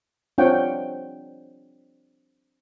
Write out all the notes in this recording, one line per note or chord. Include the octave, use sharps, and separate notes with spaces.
C4 D4 F4 C#5 F#5 G5